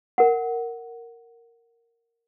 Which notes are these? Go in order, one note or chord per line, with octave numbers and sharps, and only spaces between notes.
A#4 F#5